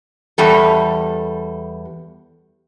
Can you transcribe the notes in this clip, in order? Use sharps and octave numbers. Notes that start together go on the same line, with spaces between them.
E2 G3 A4